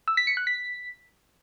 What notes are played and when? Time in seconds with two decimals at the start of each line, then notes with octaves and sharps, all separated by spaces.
0.08 E6
0.17 B6
0.27 C#7
0.37 F#6
0.47 B6